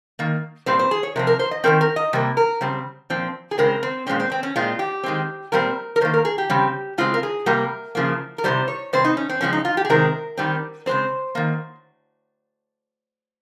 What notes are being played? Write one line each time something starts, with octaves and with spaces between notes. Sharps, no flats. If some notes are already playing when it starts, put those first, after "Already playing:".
D#3 A#3
A#2 G3 C4 C5
C5
G#4
C#5
C3 F3 C4 A#4
A#4
C5
D#5
D#3 G#3 C4 A#4
A#4
D#5
C3 G3 A#3
A#4
C#3 G3 C4
A#2 F3 C4
G#4
C#3 G#3 C4 A#4
C4
A#2 G#3 C4 C#4
C4
C4
C#4
A#2 G#3 C4 F4
G4
D#3 G#3 C4
A#2 G3 C4 A#4
A#4
D#3 A#3 C5
A#4
G#4
G4
C#3 G3 C4
C#3 G#3 C4 F4
A#4
G#4
C3 G3 A#3 A#4
C#3 F3 A#3
A#4
C3 D#3 G3 C5
C#5
C3 G3 C4 C5
D#4
C#4
C4
C#3 F3 G#3 C4 C#4
D#4
F4
G4
G#4
C3 D#3 G#3 C4 A#4
D#3 G3 C4
C#3 G#3 C4 C5
D#3 A#3